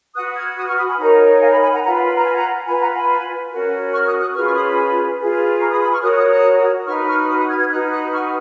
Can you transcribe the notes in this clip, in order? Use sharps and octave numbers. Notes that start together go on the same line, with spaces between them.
F#4 B4 D#6 F#6
F6 G#6
D#6 F#6
C#6 F6
B5 D#6
G#5 B5
D#4 A#4 C#5 F#5 A#5
F5 G#5
G#5 B5
G#5 B5
F#5 A#5
F4 B4 F#5 A#5
B5
A#5
G#5
F#5 A#5
F4 B4 G#5 B5
F#5 A#5
G#5 B5
C#4 F#4 A#4
C#6 F6
D#6 F#6
D#6 F#6
C#4 F4 G#4 B4 C#6 F6
C#6 F6
B5 D#6
G#5 B5
F4 G#4 B4
A#5 C#6
B5 D#6
B5 D#6
C#6 F6
F#4 A#4 C#5 D#6 F#6
D#6 F#6
D#6 F#6
D#4 F#4 B4 C#6 F6
C#6 F6
B5 D#6
D#6 F#6
F6 G#6
F6 G#6
D#4 F#4 B4 D#6 F#6
D#6 F#6
C#6 F6